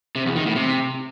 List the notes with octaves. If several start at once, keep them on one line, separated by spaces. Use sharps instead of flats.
C3
E2
D#3
A2
C3